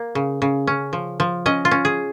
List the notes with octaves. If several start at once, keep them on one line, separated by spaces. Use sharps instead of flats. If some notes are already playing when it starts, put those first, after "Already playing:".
Already playing: A#3
C#3
C#3
C#4
F3
F3
C#4 D#5
F4
C#4
G#4